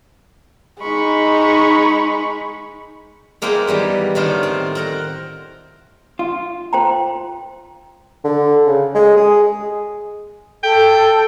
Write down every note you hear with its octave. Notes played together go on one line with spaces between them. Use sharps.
G#3 D#4 B5 C#6
G#3 A#3 B3 E4 C5 G5
D#3 E3 G3 B3
A2 D3 D#3 F4 C5
C4
C4 A#4 F#5
F4
C5 G5 A#5
D3
C#3
G#3
G#4
A4 G5